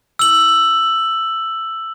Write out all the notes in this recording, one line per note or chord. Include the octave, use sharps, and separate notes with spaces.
E6 F#7